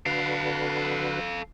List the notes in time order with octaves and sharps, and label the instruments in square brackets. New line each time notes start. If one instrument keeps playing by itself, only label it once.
[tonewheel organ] D3 F#4 B4 [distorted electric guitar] A4 F5